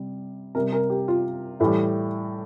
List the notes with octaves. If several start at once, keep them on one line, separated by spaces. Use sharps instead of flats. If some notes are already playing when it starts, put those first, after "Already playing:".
Already playing: C3 G3
C3 G3 A#4
A#4
G4
F4
A2 E3 G3 E4